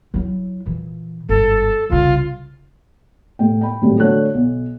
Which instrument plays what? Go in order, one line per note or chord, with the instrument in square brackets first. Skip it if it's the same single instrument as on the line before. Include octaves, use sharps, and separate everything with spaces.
[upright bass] F#3 E4
A#2 E3
[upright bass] G1 G#2 [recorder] A4
[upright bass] C2 C#3 [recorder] F4
[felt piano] A2 G5
G5 B5
G#1 A2 F#3 G3
D3 A3 F#4 C#5 F#6
B1